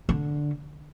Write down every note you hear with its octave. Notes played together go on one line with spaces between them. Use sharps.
D3